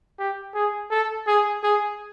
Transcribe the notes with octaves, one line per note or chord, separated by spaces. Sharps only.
G4
G#4
A4
G#4
G#4